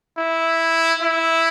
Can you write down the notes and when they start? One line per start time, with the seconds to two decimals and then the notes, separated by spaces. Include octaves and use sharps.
0.18 E4
1.02 E4